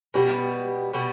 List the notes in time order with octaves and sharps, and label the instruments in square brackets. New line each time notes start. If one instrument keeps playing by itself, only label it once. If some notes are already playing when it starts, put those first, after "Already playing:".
[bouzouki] B2 G3 B3 [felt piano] G4
[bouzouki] B2 G3 B3